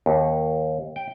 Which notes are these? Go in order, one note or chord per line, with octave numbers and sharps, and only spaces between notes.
D#2
G5